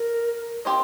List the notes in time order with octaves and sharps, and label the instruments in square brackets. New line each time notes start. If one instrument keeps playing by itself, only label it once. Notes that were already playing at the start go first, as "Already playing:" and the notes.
Already playing: [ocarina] A#4
[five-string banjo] C4 G4 C5 D#5